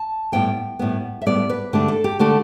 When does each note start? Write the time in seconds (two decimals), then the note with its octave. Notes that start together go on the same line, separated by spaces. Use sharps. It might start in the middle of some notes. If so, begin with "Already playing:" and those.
Already playing: A5
0.32 A2 G3 B3 G5
0.79 A2 G3 B3
1.22 E5
1.26 A2 G3 B3 D5
1.49 B4
1.73 D3 A3 D4 G4
1.88 A4
2.04 G4
2.19 D3 A3 D4 G4